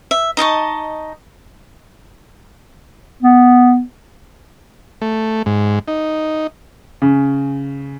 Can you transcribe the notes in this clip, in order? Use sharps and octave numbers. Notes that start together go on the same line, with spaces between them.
E5
D#4 D#5 A5 C#6
B3
A3
G#2
D#4
C#3